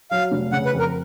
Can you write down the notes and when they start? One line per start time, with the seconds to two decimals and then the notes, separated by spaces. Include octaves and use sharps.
0.11 F#3 F5
0.31 F1
0.52 C#3 F#5
0.65 B4
0.73 F2
0.79 A#4